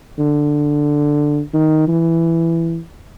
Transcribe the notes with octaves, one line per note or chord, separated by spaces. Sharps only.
D3
D#3
E3